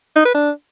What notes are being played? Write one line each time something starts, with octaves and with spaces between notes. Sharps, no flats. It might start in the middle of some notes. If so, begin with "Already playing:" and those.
D#4
B4
D4